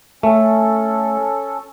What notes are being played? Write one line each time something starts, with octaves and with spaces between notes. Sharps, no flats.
A3 C#4 A4